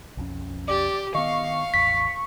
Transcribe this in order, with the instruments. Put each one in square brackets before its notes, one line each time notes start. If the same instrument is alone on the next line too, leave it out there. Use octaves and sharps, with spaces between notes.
[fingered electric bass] B1 F2 C#4
[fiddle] G4 [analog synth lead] D5
[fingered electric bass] D#3 B3 [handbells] D#5 [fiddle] F5 [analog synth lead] C#6
[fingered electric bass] A1 E2 [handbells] B6